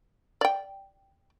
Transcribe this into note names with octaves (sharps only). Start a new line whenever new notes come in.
D5 G5